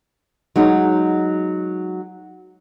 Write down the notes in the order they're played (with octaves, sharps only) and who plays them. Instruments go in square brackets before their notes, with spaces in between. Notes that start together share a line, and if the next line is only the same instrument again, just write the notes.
[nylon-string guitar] F#3 G#3 D#4